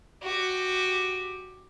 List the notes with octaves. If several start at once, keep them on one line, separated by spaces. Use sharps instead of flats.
F#4 G4